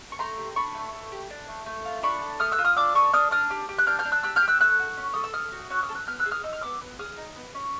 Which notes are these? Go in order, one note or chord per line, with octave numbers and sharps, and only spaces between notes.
C#6
A3 A#5 C6
G4
D4 B5 C#6
A3
A3
G4
D4
A3
A3
F4
D4 B5 C#6
A4
A3 D#6 F6
E6 F#6
F4
D#6 F6
D4 D6 E6
A4 C#6 D#6
D4 D#6 F6
D4 D#6 F6
G4
G4
F#6
D4 F6 G6
F6 G6
D4
E6 F#6
G4 E6 F#6
F6 G6
G4
E6 F#6
A3 E6 F#6
F#4
C#4
A4 D#6
E6
A3 D#6 F6
F#4
C#4 E6 F#6
D#6 F6
A4
E6 F#6
B3 F6 G6
E6 F#6
G#4
D#6 F6
D#4 E6
F6
B3 D6 E6
B3
G#4 D#6 F6
D#4
B3
C#4